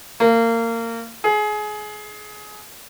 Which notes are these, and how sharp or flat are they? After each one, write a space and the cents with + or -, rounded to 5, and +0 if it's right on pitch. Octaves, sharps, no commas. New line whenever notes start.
A#3 -25
G#4 +25